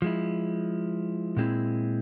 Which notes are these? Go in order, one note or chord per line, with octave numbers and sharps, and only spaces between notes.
F3 G#3 E4
A#2 G#3 C4 E4